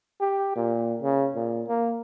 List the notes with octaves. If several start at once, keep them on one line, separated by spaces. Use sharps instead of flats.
G4
A#2
C#3
A#2
A#3